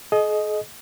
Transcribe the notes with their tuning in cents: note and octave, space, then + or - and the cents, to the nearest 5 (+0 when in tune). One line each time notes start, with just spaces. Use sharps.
G#4 +45 D#5 +0